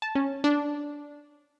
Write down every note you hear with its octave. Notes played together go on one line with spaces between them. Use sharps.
A5
C#4
D4